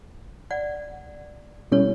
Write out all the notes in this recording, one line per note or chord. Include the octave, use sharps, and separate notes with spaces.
D5 F#5
B2 G3 C#4 E4 A4 C#5